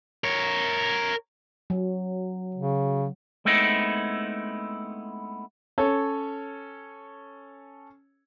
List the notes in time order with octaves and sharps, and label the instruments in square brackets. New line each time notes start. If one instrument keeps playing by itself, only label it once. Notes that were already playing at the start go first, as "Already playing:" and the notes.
[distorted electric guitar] A#4 C#5
[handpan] F#3
[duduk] C#3
[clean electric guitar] G#3 A3 B3 C4 D#4 E4
[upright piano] C#4 A4 C#5